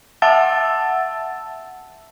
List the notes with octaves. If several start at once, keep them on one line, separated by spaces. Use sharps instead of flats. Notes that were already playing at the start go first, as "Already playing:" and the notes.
E5 F#5 A5 E6 A6